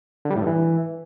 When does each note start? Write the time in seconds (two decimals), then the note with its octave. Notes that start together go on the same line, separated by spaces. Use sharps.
0.25 D3
0.30 G3
0.36 A2
0.41 G2
0.47 E3